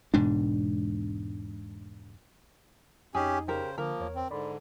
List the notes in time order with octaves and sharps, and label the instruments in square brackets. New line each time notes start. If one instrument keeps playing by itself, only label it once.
[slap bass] E1 G#2 B2 D4
[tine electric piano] F2 D#4 [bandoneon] C#4 G4 [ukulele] G#4
[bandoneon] C#3 C5 [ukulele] G4 A#4
[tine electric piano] D3 [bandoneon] F3 A#3 [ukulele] A#4
[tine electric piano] E2 C#5
[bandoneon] C4
[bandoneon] G#2 D3 [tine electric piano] D5 B5 C6